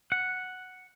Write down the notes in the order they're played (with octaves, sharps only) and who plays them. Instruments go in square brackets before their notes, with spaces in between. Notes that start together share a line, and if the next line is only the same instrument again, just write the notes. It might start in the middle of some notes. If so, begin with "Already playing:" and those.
[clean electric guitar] F#5